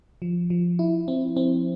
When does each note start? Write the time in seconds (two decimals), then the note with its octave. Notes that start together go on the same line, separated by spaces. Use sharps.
0.22 F3
0.50 F3
0.79 E4
1.08 C4
1.37 C4